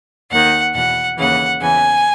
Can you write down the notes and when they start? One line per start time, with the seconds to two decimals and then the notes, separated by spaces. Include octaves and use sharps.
0.31 D#2 D#3 F#5
0.74 E2 B2 F#5
1.17 D#2 C#3 E3 F#5
1.61 E2 C#3 E3 G#5